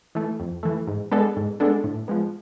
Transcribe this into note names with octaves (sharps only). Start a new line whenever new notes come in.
E3 A3
F2
E3 A3
G#2
G#3 B3 D4 A4
G#2
G#3 B3 D4 A4
A2
F3 G#3 B3